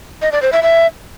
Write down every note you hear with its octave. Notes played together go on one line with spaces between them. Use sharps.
D#5
D5
C5
E5
E5